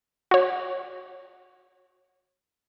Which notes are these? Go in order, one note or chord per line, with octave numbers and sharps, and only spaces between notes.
F#4 C#5